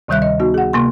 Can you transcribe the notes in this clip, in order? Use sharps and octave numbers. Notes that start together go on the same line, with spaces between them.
D2 C3 D#3 G3 E5 F#6
D#5
B3 D#4 F#4
G#4 F#5
C3 A#3 C6